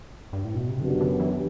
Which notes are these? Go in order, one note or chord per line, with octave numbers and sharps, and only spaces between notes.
G2
A2
B2
C3
F#2 D3 F#3 B3 D4 G4
D3
E3